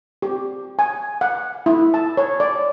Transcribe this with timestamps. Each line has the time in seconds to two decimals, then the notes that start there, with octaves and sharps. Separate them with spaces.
0.22 G4
0.79 G#5
1.21 F#5
1.66 E4
1.94 A5
2.17 C#5
2.40 D5